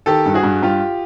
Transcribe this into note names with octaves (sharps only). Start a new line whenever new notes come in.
D#3 G4 A4
G2
F#4 G#4
G2
G2 F4 G4